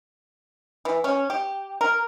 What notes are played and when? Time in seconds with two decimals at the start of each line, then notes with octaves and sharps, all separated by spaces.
0.85 E3
1.04 C#4
1.30 G4
1.81 A#4